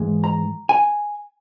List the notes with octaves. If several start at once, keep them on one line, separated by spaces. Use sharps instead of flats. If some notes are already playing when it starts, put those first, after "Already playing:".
Already playing: G#2 E3 G#3
A#5
G#5